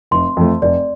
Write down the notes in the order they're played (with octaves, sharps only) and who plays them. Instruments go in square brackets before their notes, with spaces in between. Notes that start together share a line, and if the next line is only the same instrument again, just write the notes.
[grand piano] F1 [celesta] C6
[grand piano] F2 F3 A3
[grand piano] F1 [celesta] D5